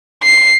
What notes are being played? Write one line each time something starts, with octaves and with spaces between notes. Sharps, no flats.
C7